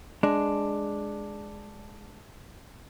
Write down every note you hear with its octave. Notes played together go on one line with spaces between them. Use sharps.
G#3 D4